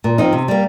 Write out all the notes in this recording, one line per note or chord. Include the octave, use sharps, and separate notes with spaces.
A#2
F3 C4 D#4
C3
G3 A#3